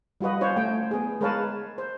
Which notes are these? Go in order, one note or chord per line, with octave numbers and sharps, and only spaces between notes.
G3 F4 F#4 B4 D#5
C#4 F4 C5 C#5
A3 G5
B3 G#4
G#3 A#4 B4 C#5 F5 A5
C5